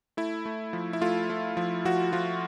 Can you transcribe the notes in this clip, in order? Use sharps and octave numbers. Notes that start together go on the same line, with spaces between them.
A3 E4
A3
F3
E4
A3 F4
A3
F3
F3 F#4
F3 F4